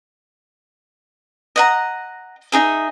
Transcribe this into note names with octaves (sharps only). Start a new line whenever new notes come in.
D#5 F#5 A#5
D#4 G#4 E5